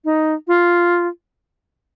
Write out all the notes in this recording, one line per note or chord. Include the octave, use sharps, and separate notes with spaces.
D#4
F4